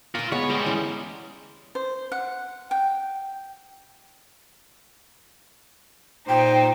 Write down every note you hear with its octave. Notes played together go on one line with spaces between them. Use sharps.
F4 A#4 B4 C#6
G#3 B3 C#5
G3 G#3 A#5
E3 C#4
C5
F#5
G5
A#2 D#4 C5 G5